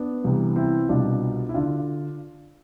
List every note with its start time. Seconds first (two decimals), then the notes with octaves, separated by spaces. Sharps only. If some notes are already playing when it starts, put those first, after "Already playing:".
Already playing: B3 D4
0.24 C2 C3 E3
0.56 C4 E4
0.89 C2 B2 D4 F4
1.49 E4
1.54 D3 D4 F4